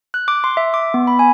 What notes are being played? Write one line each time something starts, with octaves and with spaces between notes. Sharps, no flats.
F#6
D6
C6
E5
D6
B3
B5
G#5